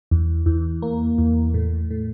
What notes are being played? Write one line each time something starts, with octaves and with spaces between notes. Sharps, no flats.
E2
E2
A#3
E2
A2
A2